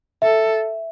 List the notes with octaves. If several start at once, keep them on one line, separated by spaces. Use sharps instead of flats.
A4 E5